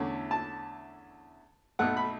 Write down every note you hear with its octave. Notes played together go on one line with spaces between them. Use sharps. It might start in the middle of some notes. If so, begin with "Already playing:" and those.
Already playing: E2 D3 A3 C#4 E4
A5
B1 B2 A3 F#5
B5